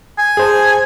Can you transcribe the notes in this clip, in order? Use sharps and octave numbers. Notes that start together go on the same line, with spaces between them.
G#5
G#4 C5 A5